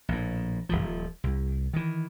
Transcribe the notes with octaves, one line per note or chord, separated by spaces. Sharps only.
A#1 A2
D#1 C2 F3
C2
D#3 E3